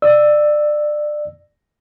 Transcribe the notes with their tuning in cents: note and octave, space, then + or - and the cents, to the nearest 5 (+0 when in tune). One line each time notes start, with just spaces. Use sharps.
D5 +25 E6 +0